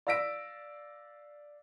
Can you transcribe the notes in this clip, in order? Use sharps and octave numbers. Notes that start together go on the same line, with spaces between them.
D5 F5 E6 A#6 B6 D7